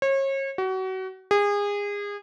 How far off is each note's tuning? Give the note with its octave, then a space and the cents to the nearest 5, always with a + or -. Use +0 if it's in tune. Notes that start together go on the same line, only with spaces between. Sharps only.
C#5 -35
F#4 +30
G#4 -30